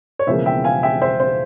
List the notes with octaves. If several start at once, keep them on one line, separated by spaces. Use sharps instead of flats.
C#5
E1 E2 C#3 F3 A#3 C5 E5
E5 G5
F5 G#5
E5 G5
C5 E5
C5